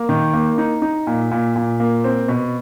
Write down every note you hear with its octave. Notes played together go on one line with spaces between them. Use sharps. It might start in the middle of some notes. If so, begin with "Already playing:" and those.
Already playing: A#3
D#3
A#3
D#4
D#4
A#2
A#2
A#2
A#3
C4
B2